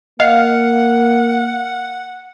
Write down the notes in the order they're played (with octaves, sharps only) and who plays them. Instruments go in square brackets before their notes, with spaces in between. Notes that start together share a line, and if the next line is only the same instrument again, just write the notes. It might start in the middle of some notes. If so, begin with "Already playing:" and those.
[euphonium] A#3 [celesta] D#5 [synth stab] F5 [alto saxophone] F#5